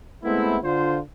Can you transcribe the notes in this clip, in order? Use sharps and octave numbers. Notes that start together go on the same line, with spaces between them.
G#3 A3 B3 C4 E4
D3 F4 C5